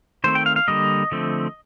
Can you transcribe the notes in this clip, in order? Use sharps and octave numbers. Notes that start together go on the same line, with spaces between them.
D#3 A3 C4 C5
G5
F5
F5
D3 G3 A#3 D#5
D3 F3 A3 C4